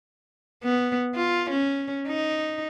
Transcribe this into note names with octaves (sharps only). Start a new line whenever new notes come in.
B3
F4
C#4
D#4